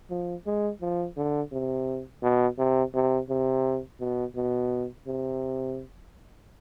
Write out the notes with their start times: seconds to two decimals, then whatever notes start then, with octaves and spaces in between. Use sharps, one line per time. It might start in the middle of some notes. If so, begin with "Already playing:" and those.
0.10 F3
0.46 G#3
0.81 F3
1.17 D3
1.52 C3
2.22 B2
2.58 C3
2.94 C3
3.29 C3
4.00 B2
4.36 B2
5.07 C3